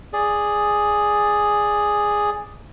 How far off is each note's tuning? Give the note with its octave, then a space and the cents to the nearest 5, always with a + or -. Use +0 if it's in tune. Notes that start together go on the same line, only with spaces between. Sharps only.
G#4 +0 D5 +0